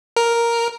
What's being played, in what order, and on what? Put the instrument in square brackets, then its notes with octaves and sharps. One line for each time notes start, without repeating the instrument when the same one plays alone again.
[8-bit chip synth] A#4